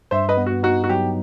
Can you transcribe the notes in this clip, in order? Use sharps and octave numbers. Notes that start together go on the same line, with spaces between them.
G2 C5 E5
B4 D#5
B3
F#4
D#4 F#4
F#4
F#3 G4